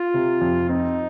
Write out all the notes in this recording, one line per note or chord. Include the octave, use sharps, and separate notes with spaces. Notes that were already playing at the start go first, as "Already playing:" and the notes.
Already playing: F4
C3
F2
C4 D#4